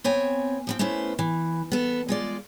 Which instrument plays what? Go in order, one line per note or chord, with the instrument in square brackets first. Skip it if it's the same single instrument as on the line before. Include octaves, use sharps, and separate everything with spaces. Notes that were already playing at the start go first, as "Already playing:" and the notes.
[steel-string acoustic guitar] B3 C4 C#5 G#5
F3 B3 C4
A3 B3 C#4 E4 C5
E3
B3 A4
G#3 F4 D5